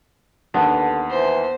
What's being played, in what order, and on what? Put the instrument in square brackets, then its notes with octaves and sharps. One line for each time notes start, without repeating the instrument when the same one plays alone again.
[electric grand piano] D#2 [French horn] D3 [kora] B3 D4
[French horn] E3 [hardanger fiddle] C5